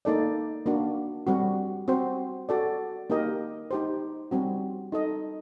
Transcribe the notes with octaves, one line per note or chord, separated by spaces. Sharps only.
A#3 D#4 A4 D5
A#3 D4 F#4
G3 C4 F#4
C4 F#4 C5
F#4 A4 D5
A#3 D#4 G4 A#4 D#5
D#4 G4 C5
G3 C4 F#4
D#4 A4 D#5